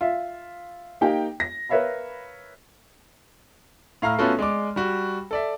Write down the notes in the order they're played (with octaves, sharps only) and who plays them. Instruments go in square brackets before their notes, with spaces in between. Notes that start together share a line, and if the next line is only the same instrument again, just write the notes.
[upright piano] F4 E5
A#3 D#4 G4 G5
A#6
A#4 B4 C#5 E5 F5 B5
[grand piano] A2 F5 A#5 F6
A3 B3 C#4 F4 F#4 A4
G#3 D5 D6
G3 F#4
A4 D5 E5